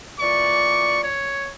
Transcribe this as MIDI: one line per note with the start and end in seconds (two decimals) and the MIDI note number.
0.20 1.03 46
0.20 1.03 52
0.20 1.03 74
0.20 1.00 85
1.04 1.52 73